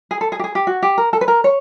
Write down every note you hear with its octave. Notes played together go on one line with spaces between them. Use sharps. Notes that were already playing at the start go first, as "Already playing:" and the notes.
G#4
A4
G#4
G4
G#4
G4
F#4
G4
A#4
A4
B4
A#4
C#5